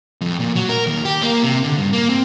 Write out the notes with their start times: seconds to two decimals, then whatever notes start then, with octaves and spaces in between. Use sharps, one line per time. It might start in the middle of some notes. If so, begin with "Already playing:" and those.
0.21 F2
0.40 A#2
0.55 F#3
0.69 A#4
0.87 D#2
1.05 G4
1.23 A#3
1.43 C3
1.64 D3
1.78 G2
1.93 A#3
2.10 C4